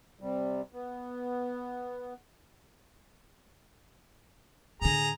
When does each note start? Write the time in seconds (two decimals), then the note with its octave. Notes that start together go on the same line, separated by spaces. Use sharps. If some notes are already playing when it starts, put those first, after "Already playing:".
0.20 C3 G3
0.73 B3
4.82 A2 D3 G#4 A#5